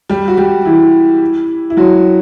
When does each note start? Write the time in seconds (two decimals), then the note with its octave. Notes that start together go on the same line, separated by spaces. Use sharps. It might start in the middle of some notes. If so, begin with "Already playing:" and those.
0.09 G3 G4
0.28 F#4
0.37 G3 G4
0.65 E3 E4
1.70 E4
1.77 F#3 F#4